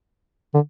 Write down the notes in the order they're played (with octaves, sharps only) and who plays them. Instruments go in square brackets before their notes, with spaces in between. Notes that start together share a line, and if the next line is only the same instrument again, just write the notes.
[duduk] D3